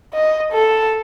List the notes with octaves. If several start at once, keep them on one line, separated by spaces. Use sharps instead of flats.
D#5
A4